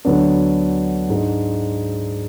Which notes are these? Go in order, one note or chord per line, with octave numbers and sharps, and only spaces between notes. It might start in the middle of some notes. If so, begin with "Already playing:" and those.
D2 D3 F#3 B3 D4
G#2 G#3 D4